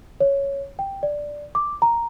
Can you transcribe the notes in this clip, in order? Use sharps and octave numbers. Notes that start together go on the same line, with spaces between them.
C#5
G5
D5
D6
A#5